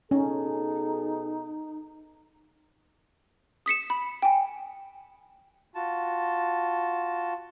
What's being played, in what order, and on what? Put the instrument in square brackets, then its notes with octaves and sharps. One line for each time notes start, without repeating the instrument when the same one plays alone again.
[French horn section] B2 G#4 A4 [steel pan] C#4 [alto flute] D#4
[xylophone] D#6 B6 C#7 E7
B5
G5 G#5
[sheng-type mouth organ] F4 F#4 A5